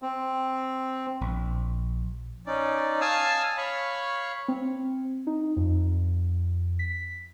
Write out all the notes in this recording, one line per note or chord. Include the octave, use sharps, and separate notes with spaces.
C4
A#1
C#4 D#4 D5
F5 G#5 A5 D#6 E6
C#5 F5 B5 C#6
C4
D#4
F2
B6